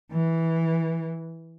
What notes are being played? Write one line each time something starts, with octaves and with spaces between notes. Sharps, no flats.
E3